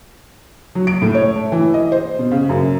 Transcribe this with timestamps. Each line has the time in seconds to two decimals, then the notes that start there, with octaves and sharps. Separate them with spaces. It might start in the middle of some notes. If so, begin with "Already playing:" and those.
0.75 F#3
0.87 D7
1.02 A2
1.14 C#5
1.35 A3
1.52 E3
1.74 D#5
1.92 C5
2.19 B2
2.31 C#3
2.49 F#2